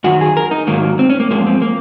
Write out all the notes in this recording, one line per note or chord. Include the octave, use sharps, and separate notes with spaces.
F#2 D#3 F#3 F#4
G#4
A#4
D#4
G#2 D#3 F#3 A#3
C4
C#4
A#3
F#2 F3 G#3 A#3
C4
A#3